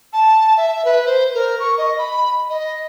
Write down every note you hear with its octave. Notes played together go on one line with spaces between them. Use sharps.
A5
E5
B4
C5
A#4
C#6
D#5
B5
D#5